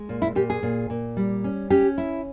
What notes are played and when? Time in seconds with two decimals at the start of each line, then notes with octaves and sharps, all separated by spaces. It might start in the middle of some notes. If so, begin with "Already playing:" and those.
Already playing: G#3
0.09 A#2
0.22 E4
0.35 A#2 G4
0.50 G#4
0.63 A#2
0.90 A#2
1.17 G3
1.44 C#4
1.70 C#4 G4
1.98 E4